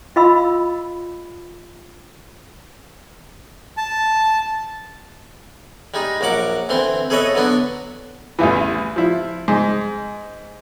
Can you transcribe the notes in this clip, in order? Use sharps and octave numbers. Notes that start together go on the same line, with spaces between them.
F4 D#5 F5 B5 C6 E6
A5
G3 G#3 D#4
A#1 F#3 A#4 F#5 D6
D2 E3 C4 C6
G#4 A4 B4 C#5 D#5 E5
D3 F#3 B3 D4
A1 E2 E3
F3 E4
G#2